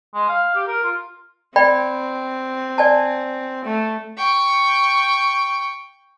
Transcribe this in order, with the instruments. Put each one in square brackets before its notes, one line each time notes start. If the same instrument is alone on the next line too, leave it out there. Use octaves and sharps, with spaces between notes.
[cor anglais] G#3
F5
G4
A#4
F4
[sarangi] C4 [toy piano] D5 G5 B5
[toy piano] D5 G#5 A5
[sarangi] A3
[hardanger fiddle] G5 C#6